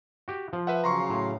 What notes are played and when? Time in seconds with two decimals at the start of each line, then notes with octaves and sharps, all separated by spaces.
0.28 F#4 G4
0.53 F3
0.67 B4 E5 F#5
0.84 C#3 F#3 F5 A#5 C6 C#6
1.10 A2